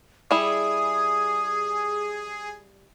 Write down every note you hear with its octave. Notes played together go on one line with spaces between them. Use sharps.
G3 E4 G#4 D#6